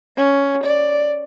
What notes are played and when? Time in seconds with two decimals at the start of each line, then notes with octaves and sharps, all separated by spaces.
0.17 C#4
0.63 D5